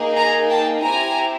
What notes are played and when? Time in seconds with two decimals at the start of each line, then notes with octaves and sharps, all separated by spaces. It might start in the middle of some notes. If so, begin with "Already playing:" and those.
Already playing: A#3 D#4 G#4
0.16 G#5 A#5
0.49 G5 A5
0.83 C4 E4 G4 G#5 A#5